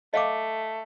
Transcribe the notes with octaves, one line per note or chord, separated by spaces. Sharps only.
A3 D#5 F5 D6